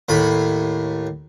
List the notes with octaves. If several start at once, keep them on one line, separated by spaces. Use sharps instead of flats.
D#2 A2 B5